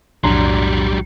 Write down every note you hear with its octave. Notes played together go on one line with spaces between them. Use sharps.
B1 F2 A2 F#3 G3 D4 A#5 C6